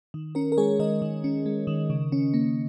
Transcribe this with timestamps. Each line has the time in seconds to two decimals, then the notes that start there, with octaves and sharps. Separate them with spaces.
0.14 D#3
0.35 C#4 A#4
0.52 A#4
0.57 G#3 G#4 C#5
0.80 D#3 A#4 D#5
1.02 D#3
1.24 C#4
1.46 G#3
1.67 D#3
1.90 C#3
2.12 C#4
2.34 A#3